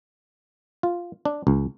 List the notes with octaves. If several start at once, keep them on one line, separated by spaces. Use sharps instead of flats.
F4
D4
C#2